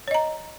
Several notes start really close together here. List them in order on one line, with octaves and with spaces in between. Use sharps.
C#5 D#5 A#5